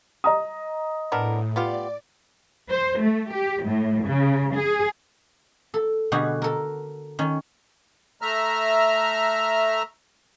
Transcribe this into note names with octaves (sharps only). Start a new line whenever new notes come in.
D#5 A#5 D#6
A2 B3 D4 A#4
B3 F4 G4 D5
C5
A3
G4
A2
C#3
G#4
A4
B2 D3 G3 F#4 G#4
A4 A#4
D#3 C#4
A3 E5 A#5 F6